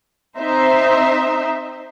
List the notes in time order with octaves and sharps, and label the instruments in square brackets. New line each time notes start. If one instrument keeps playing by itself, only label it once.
[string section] C4 D#4 C5 E5